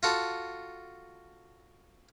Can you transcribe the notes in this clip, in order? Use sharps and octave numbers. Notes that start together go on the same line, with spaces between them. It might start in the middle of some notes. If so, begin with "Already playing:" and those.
F4 F#4 A4